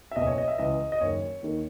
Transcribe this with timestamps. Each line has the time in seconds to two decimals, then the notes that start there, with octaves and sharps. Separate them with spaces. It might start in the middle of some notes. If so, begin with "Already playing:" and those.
0.11 E5
0.16 F#1 E2 B2 D#5
0.27 C#5
0.38 D#5
0.48 E5
0.58 C#2 C#3 E3 D#5
0.92 D#5
1.01 F#1 F#2 D#3 C#5
1.43 D#2 D#3